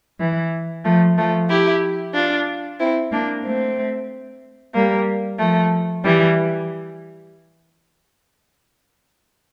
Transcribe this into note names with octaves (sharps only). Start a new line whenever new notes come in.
E3
F3 A3
F3 A3
E4 G4
D4 F4
C4 E4
A#3 D4
A3 C4
G3 A#3
F3 A3
E3 G3